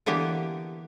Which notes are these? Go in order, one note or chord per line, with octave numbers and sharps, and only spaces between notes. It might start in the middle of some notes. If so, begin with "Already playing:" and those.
D3 E3 A#3 B3 G4